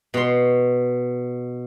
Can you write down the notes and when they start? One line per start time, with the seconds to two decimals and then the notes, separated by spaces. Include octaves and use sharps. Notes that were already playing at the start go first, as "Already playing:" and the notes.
0.14 B2 C6